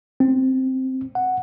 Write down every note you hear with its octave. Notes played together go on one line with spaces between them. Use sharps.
C4
F#5